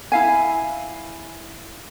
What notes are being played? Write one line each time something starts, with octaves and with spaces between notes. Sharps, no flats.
E4 F5 G#5